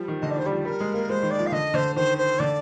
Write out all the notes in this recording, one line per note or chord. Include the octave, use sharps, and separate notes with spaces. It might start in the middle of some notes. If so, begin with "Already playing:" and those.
Already playing: F3 G3
D#3
D3 D#5
D5
D#3 C5
G3 D5
F3
G3 A#4
G#3
A#3
G#3 C5
D#3
D5
F3
F5
D3 D#5
D3 C5
D#3 C5
C5
D3 D5